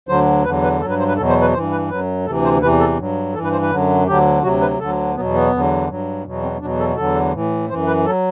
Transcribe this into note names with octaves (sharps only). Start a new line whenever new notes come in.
D2 D3 F#3 C5
E2 D3 F#3 B4
B4
G2 F#3 A4
B4
C5
B4
E2 B2 F#3 A4
C5
B4
G2 E3 C5
B4
F#2 F#3 B4
D2 C3 E3 A4
C5
E2 C3 E3 B4
A4
G2 F#3
G2 E3 A4
B4
C5
B4
F#2 D3 F#3
D2 D3 F#3 G4
D2 C3 F#3 F#4
B4
D2 D3 F#3 A4
E2 B2 F#3 B3
B3
E2 D3 F#3
G2 F#3
E2 B2 F#3
C4
E2 B2 F#3 D4
A4
E2 D3 F#3 A4
A2 E3
F#2 E3 C5
B4
F#3 A4